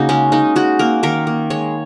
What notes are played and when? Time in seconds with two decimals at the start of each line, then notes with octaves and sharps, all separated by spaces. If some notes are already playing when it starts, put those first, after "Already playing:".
Already playing: C#3 A#3 D#4 F#4
0.09 G#3 C#4
0.32 G#3 D#4
0.56 G#3 F#4
0.79 A#3 A#4
1.03 D#3 A#4
1.27 A#3
1.50 G#3 C#5